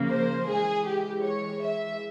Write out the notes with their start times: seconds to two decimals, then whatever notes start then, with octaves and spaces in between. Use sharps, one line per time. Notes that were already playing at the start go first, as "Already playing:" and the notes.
Already playing: C#3 F3 A#3
0.11 C5
0.49 E3 G#3 G#4
0.86 G4
1.24 C#5
1.62 E5